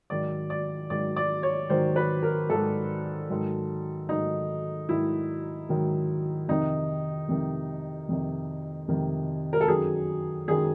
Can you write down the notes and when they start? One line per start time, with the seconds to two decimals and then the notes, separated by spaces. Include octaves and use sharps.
0.10 G#2 D#3 F#3 D5
0.50 D5
0.90 G#2 D#3 F#3 D5
1.16 D5
1.43 C#5
1.70 G#2 D#3 F#3 C5
1.96 B4
2.23 A#4
2.49 G#2 D#3 F#3 A4
3.30 G#2 D#3 F#3
4.09 G#2 D#3 F#3 D#4
4.89 G#2 D#3 F#3 E4
5.69 G#2 D#3 F#3
6.48 F2 C3 D#3 D#4
7.29 F2 C3 D#3
8.09 F2 C3 D#3
8.88 F2 C3 D#3
9.53 A#4
9.61 A4
9.68 F#2 D#3 F#3 G#4
10.48 F#2 D#3 F#3 G#4